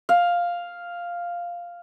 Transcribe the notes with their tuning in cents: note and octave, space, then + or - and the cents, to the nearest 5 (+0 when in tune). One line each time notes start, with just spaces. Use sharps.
F5 +0